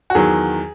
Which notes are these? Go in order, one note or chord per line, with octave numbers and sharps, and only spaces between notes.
F#4
E2 D#3 F#3 G#4